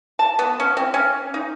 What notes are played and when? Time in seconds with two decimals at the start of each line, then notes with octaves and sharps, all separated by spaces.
0.19 A5
0.39 B3
0.60 C#4
0.77 C4
0.94 C#4
1.34 D#4